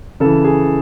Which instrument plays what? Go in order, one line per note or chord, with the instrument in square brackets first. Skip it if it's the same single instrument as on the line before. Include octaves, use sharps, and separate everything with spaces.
[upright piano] C#3 E3 A4
G#4